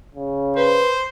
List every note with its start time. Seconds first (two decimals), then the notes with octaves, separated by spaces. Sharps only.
0.15 C#3
0.57 B4 C5